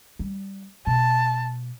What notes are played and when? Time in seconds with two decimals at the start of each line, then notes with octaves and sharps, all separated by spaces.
0.19 G3
0.87 B2 A5